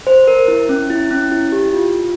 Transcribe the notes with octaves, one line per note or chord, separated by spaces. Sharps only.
C5
A#4
E4
C#4
E4
C#4
E4
G4
F4